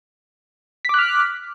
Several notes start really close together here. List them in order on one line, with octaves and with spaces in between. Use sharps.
B6 D6 F#6 F6